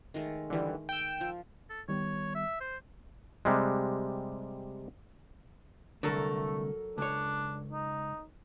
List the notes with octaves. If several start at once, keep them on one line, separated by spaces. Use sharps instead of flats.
D#3 G#3 A3
D3 E3 G3
G5 E6
F3
A4
D#3 G3 B3 C#5
E5
C5
C3 G3 G#3
C2 G2 D3 F#3 A3 A4 A#4
C#2 D4 C#5
D#4